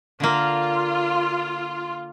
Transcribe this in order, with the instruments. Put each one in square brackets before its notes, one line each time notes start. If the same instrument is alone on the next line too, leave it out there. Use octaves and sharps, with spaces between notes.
[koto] D3 A#3 [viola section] F4